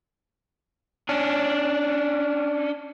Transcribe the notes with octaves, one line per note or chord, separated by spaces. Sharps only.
C#4 D4